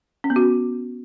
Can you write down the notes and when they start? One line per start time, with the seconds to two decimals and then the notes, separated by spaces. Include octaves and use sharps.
0.24 C#4
0.30 B3
0.36 F#4